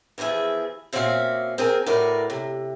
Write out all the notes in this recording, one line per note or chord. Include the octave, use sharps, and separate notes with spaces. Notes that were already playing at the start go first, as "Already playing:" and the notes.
E2 E3 F3 G#4 E5
A#2 C4 C#4 F#4 E5 F5
C4 G#4 A#4
A2 F#4 A#4 B4 D5
C3